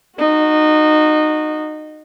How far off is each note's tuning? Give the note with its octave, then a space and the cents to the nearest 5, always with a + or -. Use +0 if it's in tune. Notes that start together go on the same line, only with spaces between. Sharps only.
D#4 -20 F#4 -15